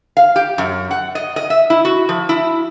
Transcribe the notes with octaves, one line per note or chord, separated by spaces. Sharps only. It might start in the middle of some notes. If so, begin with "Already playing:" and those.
F5
G4
F#2
F#5
D#5
D#5
E5
E4
F#4
F3
E4